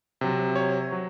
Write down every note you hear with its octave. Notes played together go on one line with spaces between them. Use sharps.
C3 F#3
C#5
F#3